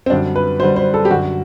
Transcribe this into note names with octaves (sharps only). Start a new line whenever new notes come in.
C4
F#2 D3 G3 D4
B4
F#2 D3 G3 C5
C5
A4
G4
F#2 D3 F#3 F#4